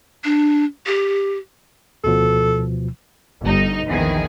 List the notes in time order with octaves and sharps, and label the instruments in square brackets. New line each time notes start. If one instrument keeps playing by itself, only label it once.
[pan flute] D4
G4
[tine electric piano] D2 B2 F3 [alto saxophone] A4
[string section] G1 D#4
A#1 E2 D#3 G#4